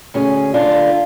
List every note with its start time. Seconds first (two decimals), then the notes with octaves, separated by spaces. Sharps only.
0.14 D2 C#4 G#4
0.54 D3 D4 F4